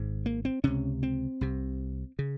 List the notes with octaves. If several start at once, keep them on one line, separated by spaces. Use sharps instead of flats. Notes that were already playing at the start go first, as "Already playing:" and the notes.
Already playing: G#1 G#2
A#3
C4
C#2 C3 C#4
C4
C2 C3
C#3